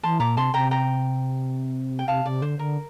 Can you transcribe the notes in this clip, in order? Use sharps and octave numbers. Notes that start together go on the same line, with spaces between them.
E3 A5 C6
A#2 A#5 D6
C3 A5 C6
C3 G5 A#5
G5 A#5
G5
C3 F5 A5
C3 D5
D3 C5
D3 A#4